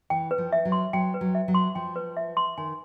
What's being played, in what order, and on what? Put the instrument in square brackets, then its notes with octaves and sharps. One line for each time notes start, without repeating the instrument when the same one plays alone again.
[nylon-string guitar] E3 [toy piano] G5
[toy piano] B4
[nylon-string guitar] F3
[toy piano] E5
[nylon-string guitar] F#3
[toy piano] C6
[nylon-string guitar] F#3 [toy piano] G5
[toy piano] B4
[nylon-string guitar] F#3
[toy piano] E5
[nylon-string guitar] F#3
[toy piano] C6
[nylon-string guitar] F3 [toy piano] G5
[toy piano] B4
E5
C6
[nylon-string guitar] D#3 [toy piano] G#5